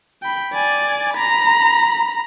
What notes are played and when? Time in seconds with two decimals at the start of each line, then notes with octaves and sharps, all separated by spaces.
0.22 G5 B5
0.53 D5 G#5
1.13 A#5 B5